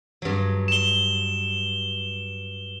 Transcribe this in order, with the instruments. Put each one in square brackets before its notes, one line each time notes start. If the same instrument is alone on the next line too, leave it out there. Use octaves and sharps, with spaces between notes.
[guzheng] G2 F#3
[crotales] E7 G7